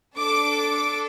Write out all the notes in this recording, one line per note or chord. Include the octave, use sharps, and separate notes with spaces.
D4 A4 D6